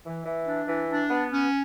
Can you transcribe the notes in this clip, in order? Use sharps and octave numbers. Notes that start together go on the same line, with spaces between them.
E3
E3
D4
E3
D4
B3
C#4